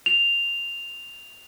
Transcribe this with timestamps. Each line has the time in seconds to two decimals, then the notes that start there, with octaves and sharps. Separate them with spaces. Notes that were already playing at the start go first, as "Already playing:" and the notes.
0.06 F7